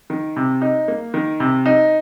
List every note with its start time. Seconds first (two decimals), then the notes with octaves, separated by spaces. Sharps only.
0.10 D#3
0.36 C3
0.62 D#4
0.88 A#3
1.14 D#3
1.40 C3
1.66 D#4